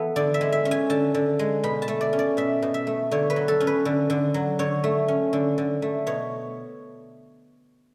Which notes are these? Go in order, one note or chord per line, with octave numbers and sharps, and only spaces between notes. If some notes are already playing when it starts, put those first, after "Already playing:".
Already playing: E3 B3 A4
D3 D5
E5
G#3
E5
C#4
G#5
D3 A5
D3
G#3
B2 B5
A5
A3
D5
C#4
D5
B2 E5
B2
E5
A3
D3 C#5
B4
F#3
A4
C#4
B4
D3
D3
F#3
D3 C#5
A3
C#4
D3
D3
A3
B2 C#5